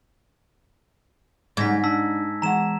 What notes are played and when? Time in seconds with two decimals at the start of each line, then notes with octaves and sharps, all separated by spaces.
1.57 G#2 C#3 G3 G#3 G#6 A#6 B6
1.84 D4 A5 E6 B6
2.42 E3 G#3 F#5 A#5 E7